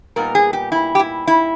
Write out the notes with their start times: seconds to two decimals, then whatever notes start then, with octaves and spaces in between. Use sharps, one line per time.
0.16 A#2 G3 B3 D#4 A#4
0.35 G#4
0.53 G4
0.72 E4
0.95 G4
0.99 E4
1.27 E4